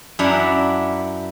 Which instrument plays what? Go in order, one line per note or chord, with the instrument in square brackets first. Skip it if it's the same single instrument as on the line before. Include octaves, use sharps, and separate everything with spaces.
[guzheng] F#2 D4 E4 E5 F#5 A#5